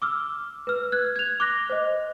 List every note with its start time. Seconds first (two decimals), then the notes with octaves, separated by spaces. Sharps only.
0.02 D6 E6 F6
0.67 B4 F6
0.92 F#6 G#6
1.16 G#6 F7
1.40 D6 F#6 A#6
1.70 C5 D#5